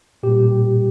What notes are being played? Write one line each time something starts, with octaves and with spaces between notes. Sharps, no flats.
A#2 G4
G3